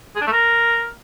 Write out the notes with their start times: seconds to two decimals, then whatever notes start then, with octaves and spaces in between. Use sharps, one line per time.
0.16 G#4
0.21 D4
0.27 A3
0.32 A#4